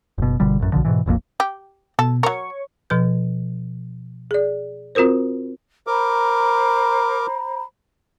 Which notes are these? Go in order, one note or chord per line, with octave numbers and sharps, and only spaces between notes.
F#1 B2
G1 B2 D3 G3
A1 F#2
B1 B2 D3 F3
G#2 B2 E3
F1 A#1 F2 A#3
G4
B2 A4
F#3 A#4 C#5 C#6
B2 F3 B4 G6
G#4 D5
C4 F4 F#4 A#4 C5
A#4 C5 A#5 B5 D6